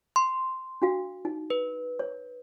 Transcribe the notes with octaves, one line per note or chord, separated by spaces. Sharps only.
C6
D4 F#4 F5
D#4
B4
C#5